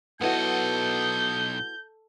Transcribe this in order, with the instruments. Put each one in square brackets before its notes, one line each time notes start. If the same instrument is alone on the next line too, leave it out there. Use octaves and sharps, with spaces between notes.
[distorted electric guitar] B1 D#5 [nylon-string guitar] B3 E4 F#4 [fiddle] A4 [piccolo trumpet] G6